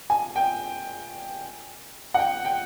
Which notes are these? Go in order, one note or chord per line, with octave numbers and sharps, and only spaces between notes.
G#5
G5
F#5
G5
G5